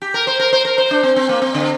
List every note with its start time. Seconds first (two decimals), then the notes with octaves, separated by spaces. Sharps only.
0.02 G4
0.14 A#4
0.27 C5
0.39 A#4
0.53 C5
0.65 A#4
0.78 C5
0.91 D4
1.03 C4
1.16 C4
1.29 A#3
1.42 C4
1.54 D3